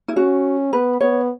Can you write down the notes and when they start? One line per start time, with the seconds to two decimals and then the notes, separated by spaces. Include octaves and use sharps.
0.08 E4
0.16 C#4 F#4
0.72 B3 B4
1.00 B3 C#5